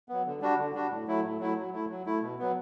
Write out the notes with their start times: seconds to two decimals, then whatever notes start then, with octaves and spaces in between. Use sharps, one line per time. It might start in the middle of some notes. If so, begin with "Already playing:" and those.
0.09 F#3 B3
0.26 D3
0.41 G3 D4 F#4
0.58 D3
0.74 G3 D4 F#4
0.91 A2
1.07 F#3 A3 E4
1.24 A2
1.40 F#3 A3 E4
1.57 F#3
1.73 A3 E4
1.89 F#3
2.06 A3 E4
2.22 B2
2.39 F#3 B3